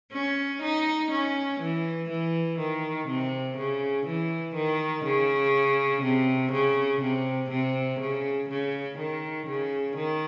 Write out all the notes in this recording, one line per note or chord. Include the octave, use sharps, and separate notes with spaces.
C#4
D#4
C#4
E3
E3
D#3
C3
C#3
E3
D#3
C#3
C3
C#3
C3
C3
C#3
C#3
D#3
C#3
D#3